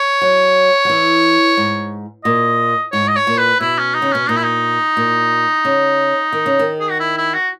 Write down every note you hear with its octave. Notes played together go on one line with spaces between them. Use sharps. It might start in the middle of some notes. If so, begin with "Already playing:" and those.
Already playing: C#5
F#3
F#3
E3
G#2
A#2 D#5
G#2 C#5
D#5
C#5
A#2
B4
B2 E4
C#4
D#4
C#3
B2 C#4
A#2 D#4
E4
D#4
A#2
C#3
D#3
C#3
D#3
G#4
F#4
E4
E4
F#4